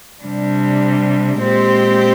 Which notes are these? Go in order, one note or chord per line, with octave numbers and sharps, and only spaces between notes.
C3 G3 D4
A#2 G#3 C4 G4 C5